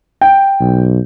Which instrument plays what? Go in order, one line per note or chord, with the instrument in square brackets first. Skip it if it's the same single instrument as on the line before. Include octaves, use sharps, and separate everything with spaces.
[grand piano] G5
[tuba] B1